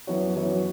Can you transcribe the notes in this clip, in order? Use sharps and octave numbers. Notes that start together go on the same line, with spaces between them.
F#2 E3 B3 F#4 C#5
F#2 E3 B3 F#4 C#5